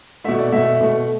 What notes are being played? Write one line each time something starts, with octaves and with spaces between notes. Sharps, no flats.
B2 A3 E5
D5
B2 A3 E5
B2 A3